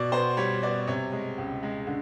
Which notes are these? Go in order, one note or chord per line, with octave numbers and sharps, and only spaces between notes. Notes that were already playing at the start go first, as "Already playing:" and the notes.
Already playing: B2 D5
B3 C5
G3 C#5
B3 D5
C3 C#5
G#3
C#2
G#3
D3